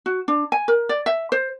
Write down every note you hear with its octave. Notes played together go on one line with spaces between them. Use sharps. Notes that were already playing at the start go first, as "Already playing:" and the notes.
F#4
D4
G#5
A#4
D5
E5
C5